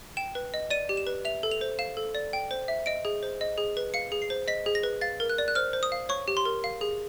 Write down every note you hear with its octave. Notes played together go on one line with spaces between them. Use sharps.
G5 E7
B4
D#5
D5 D#7
G4
E7
B4
E5 F7
A4
F7
C5
F5 E7
A4
D5
G5
C5
E5
D#5 D7
G#4
C5
D#5
G#4
B4
F5 C#7
G#4
C7
C5
D#5 B6
G#4
A#6
B4
F5 A6
A#4
F#6
D5
F#6
C5 F6
C5
D#6
F5
C#5 C#6
G4
C6
A#4
F5
G#4